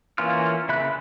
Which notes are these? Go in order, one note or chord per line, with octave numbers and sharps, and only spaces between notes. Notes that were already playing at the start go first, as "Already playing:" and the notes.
E3 A#3 C#4 F4 F6
C#3 E5 B5 F#6